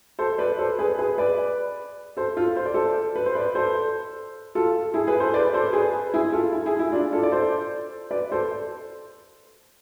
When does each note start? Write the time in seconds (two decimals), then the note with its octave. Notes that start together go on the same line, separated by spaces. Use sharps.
0.19 A4 C5
0.38 B4 D5
0.59 A4 C5
0.79 G#4 B4
0.99 G#4 B4
1.18 B4 D5
2.17 A4 C5
2.37 F4 A4
2.56 C5
2.66 D5
2.74 A4 C5
3.16 B4
3.26 C5
3.35 B4 D5
3.55 A4 C5
4.55 F4 A4
4.94 E4 G#4
5.07 G#4 B4
5.20 A4 C5
5.34 B4 D5
5.54 A4 C5
5.73 G#4 B4
6.14 E4 G#4
6.32 F4 A4
6.52 E4
6.66 E4 G#4
6.79 E4
6.92 D4 F4
7.12 F4 A4
7.23 D5
7.31 A4 C5
8.11 B4 D5
8.32 A4 C5